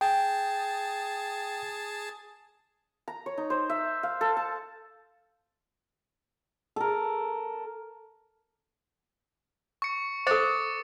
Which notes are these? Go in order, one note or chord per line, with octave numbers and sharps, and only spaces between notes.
G#4 G5 A5
A#5
C#5
D#4
C5
E5
F5
A4
A5
A4 A#4
C#6 C#7
A4 C5 D6 A6 C#7